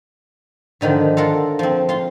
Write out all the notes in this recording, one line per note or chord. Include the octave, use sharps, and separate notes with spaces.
G#2 D3 D#3 F3
F4 A4 A#4 F#5
F3 C4
F4 C6